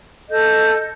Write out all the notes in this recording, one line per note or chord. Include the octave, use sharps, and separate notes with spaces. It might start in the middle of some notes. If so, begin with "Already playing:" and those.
A4 D#5 G6